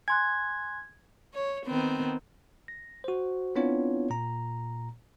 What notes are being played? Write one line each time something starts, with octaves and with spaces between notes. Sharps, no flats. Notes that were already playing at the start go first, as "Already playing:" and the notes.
G#5 C6 F#6 G#6
C#5
D#3 B3 C4
A#6
F#4 C5
B3 C4 D4 E4 F4 C#5
A#2 A#5